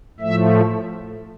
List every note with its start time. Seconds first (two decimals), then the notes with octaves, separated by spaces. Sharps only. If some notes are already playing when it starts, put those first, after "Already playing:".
0.20 A2 F3 A3 E5